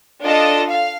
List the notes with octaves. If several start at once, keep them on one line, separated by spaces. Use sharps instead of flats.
D4 F4 A4 D#5 A5
F5